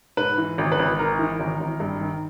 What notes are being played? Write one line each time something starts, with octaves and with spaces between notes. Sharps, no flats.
G#2 B4
E3
G#1
B4
G#1
G#2 A#4
E3
G#1
G#1
G2
D#3